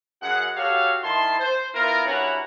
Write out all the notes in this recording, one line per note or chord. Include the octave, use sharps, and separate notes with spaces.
F#2 F#4 G#4 F#5
F#4 G4 A4 C#5 F5
D#3 E4 A5 C6
C5
B3 E4 F4 A#4
G2 C#4 E4 F#4 F#5 A#5